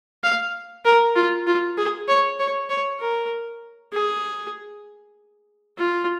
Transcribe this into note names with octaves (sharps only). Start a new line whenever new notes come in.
F5
A#4
F4
F4
G#4
C#5
C#5
C#5
A#4
G#4
F4